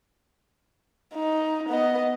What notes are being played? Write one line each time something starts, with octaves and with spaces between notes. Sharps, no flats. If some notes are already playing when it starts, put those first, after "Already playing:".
D#4
B3 D#5